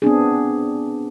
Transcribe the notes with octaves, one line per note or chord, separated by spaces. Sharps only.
B3 C4 D4 G#4